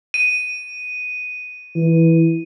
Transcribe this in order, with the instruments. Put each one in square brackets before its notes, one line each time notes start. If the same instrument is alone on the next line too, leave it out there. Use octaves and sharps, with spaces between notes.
[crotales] D#7
[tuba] E3